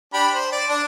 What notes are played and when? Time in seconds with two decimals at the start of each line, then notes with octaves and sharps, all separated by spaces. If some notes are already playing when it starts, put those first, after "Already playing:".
0.14 D4 G4 B5
0.32 C5
0.52 D5
0.70 D4